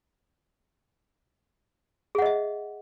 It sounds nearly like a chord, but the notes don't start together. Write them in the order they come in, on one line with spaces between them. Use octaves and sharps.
G#4 F#5 D#5 E5